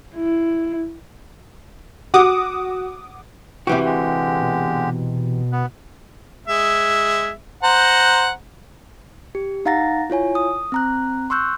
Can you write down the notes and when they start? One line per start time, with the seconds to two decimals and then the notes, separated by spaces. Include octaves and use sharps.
0.16 E4
2.14 F#4 F#5 D6 D#6
3.67 F#2 C3 E3 F#4 G4 D6
3.85 D3 G#3 G4
4.41 B2
5.52 B3
6.48 G#3 E5
7.63 C5 F#5 A#5
9.35 G4
9.65 D#4 F5 F#5 A#5 A6 A#6
10.10 E4 F4 C#5 G#5
10.35 D#6
10.72 C4 A#5 F#6
11.30 C6 C#6 E6 F#6 G6